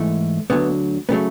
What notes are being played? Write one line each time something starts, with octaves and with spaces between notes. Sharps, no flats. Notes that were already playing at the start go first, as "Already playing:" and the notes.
Already playing: G#2 E3 A3
D2 D3 F#3 B3
C#3 F#3 A3 B3